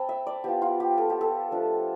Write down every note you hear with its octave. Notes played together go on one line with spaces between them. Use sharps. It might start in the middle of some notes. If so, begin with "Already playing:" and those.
Already playing: C4 G5 A5 B5
E5
D5
B3 F4 G4
F4
G4
A4
G4
A4
F3 A3 D4 F4